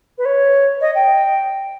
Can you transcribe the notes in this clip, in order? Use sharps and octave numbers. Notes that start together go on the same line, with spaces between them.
B4
C#5
D#5
G5